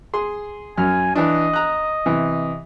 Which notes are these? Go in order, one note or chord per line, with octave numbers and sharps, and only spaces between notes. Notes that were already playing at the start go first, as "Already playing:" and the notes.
G#4 C6
F#2 G#5 F6
E3 D4 D#5
A#5 F#6
C3 E3